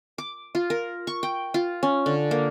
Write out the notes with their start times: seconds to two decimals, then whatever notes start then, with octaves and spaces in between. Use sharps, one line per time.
0.18 D6
0.55 F4
0.70 A#4
1.07 C#6
1.23 G5
1.54 F4
1.83 C#4
2.06 D3
2.31 A#3